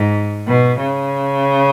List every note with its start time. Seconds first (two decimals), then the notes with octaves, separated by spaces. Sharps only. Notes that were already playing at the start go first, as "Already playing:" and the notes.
Already playing: G#2
0.47 B2
0.79 C#3